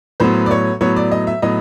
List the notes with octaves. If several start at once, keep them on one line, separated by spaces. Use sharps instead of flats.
A2 F#3 B3 C5
D5
C#5
A2 F#3 B3 C#5
D5
D#5
E5
A2 F#3 B3 D#5